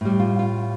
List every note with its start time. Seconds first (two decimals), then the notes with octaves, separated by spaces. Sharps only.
0.01 A2 G3
0.20 F4
0.39 F4